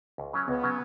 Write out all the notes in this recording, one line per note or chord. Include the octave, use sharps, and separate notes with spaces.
C#2
C#3 F#3 C#4
C#2 B3
C#3 F#3 C#4